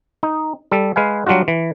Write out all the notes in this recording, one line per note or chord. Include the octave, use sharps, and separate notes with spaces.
D#4
G3 A4
G#3 B4 F5 G#5
F#3 G3 D4 F4 F#4
E3